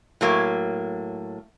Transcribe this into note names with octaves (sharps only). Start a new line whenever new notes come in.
A2 F#3 A#3